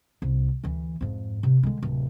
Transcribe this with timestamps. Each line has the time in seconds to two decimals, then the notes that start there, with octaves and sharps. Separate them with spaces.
0.22 C2
0.64 D2 E3
1.01 F2 G#2
1.43 C3 D#4
1.63 D3 G#3
1.83 D1 C3